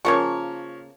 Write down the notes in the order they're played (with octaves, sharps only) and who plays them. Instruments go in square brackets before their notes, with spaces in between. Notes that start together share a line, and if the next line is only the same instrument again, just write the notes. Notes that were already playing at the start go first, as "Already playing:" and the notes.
[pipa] C#3 A#3 C#6 [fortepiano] F3 C#5